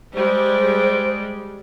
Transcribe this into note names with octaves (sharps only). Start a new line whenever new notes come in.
G3 G#3 C5